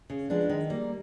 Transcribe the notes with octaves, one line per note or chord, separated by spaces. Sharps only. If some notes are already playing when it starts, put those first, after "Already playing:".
C#3
F3 G#3 B3 D4
D#3
G3 A#3